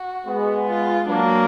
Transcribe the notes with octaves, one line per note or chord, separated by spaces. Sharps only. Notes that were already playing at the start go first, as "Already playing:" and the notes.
Already playing: F#4
G#3 B3
F4
F#3 A#3 D4